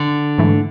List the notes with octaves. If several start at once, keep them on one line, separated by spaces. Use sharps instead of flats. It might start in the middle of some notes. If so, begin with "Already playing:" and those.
Already playing: D3
G#2 E3 A3